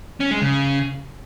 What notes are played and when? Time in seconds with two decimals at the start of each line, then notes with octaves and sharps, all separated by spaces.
0.20 C#4
0.31 G#3
0.42 C#3